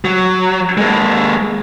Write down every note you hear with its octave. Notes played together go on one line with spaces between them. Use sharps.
F#3
G#3 A#3